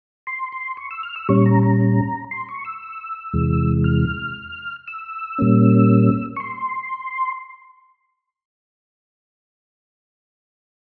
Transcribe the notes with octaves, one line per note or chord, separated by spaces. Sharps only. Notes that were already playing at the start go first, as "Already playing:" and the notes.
C6
C6
C#6
E6
F6
E6
A#2 G3 C#4 C#6
A#5
A#5
C6
C#6
E6
E2 C3 E3 G#3
F6
E6
A#2 G3 A#3 C#4
C#6
C6